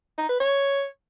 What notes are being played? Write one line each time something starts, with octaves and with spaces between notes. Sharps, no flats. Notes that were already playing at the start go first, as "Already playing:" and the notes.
D#4
B4
C#5